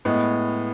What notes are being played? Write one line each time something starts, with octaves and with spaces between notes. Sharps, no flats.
A2 G#3 B3